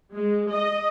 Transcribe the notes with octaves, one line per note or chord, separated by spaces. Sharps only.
G#3
D#5